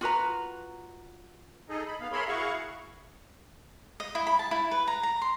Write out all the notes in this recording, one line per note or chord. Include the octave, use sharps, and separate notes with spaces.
F4 F#4 B4 A#5
D#4 G#4 A4 D#5
B5
B3 F5
G#4 A#4 C#5 E5 B5 C6
E4 F#4 G#4 F5 F#5 C#6
D#5
E4
B5
A5
E4
B4
A#5
A#5
C6